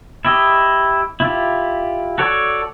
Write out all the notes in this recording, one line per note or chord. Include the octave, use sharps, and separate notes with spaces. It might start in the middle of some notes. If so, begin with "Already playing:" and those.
E4 G4 D#5
E4 F4 G4
F#4 A4 C#5 D5